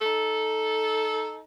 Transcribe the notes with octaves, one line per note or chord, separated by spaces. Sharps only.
D#4 A4